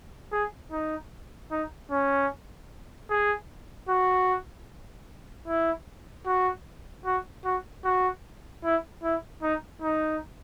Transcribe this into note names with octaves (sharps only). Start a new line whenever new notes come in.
G#4
D#4
D#4
C#4
G#4
F#4
E4
F#4
F#4
F#4
F#4
E4
E4
D#4
D#4